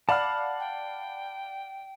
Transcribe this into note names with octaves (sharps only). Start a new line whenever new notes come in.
D5 F5 F#5 A5 B5 F6
G5